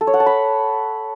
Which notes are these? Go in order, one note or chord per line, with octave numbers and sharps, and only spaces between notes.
A4
C#5
F#5
A5
B5